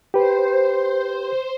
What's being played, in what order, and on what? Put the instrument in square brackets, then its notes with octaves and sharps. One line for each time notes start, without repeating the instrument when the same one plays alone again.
[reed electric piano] G4 B4 [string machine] C5